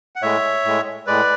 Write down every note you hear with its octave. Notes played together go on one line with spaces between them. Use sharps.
F#5
A2 G#3 C#5 E5
A2 G#3
A2 G#3 B4 D5